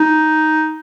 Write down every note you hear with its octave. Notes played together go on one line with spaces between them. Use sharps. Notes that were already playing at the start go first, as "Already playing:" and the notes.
Already playing: D#4